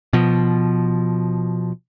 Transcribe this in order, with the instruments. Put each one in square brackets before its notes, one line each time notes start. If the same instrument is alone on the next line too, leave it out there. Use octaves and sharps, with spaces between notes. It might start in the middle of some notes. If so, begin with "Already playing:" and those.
[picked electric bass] B2 F3